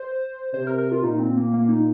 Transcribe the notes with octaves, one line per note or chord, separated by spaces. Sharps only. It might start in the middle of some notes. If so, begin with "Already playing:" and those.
Already playing: C5
C3 C5
A#4
A#4
F4
A#2 D#4
C4
A#3
A#3
D#4